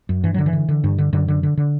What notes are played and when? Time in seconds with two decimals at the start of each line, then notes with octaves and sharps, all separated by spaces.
0.09 F#2
0.23 G2 E3
0.34 D3 F#3
0.46 E3
0.53 D3
0.69 D3
0.84 G2
0.98 D3
1.13 F#2 D3
1.28 D3
1.43 D3
1.57 D3